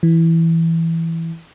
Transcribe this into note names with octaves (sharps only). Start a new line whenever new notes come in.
E3